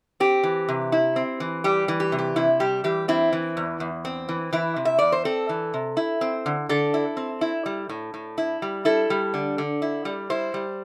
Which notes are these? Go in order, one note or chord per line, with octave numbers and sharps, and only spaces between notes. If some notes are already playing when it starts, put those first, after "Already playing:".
C4 G4
E3
C3
E4
C4
E3
G3 G4
E3
G4
C3
G4
C3 E4
G3 G4
E3 G4
C4 E4
E3
E2
E2
C4
E3
E3 E4
C3
E5
E2 D5
C5
C4 A4
E3
C3
E4
C4
D3
D3 A4
E4
C4
E4
G3
A2
A2
E4
G3
E4 A4
G3
D3
D3
E4
G3
E4 C5
G3